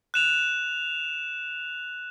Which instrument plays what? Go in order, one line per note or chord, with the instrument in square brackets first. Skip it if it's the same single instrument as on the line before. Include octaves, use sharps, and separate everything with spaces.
[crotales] F#6 E7 F7